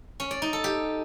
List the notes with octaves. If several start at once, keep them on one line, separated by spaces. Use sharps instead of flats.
C#4
D5
D#4
A4
G4